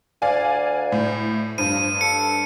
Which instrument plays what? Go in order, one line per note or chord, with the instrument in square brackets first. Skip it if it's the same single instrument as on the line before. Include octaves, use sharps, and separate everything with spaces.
[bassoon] D2 [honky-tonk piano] D5 F5 G#5
[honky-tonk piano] A2
[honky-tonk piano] G2 [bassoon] F3 [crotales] D#7
[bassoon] A4 [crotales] C#7